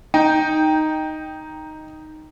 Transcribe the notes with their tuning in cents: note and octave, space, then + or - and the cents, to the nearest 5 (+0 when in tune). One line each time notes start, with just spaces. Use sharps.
D#4 +0 G5 +0